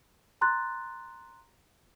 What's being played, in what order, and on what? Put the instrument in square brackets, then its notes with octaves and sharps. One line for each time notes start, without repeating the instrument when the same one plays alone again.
[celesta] A#5 C6 F#6 A6